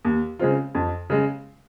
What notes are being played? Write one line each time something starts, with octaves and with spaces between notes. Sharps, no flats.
D#2
C#3 G#3 C4 F4
F2
C#3 G#3